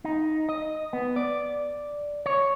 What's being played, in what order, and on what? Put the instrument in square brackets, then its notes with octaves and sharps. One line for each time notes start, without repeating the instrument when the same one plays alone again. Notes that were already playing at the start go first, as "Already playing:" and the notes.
[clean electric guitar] D#4
D#5
B3
D5
C#5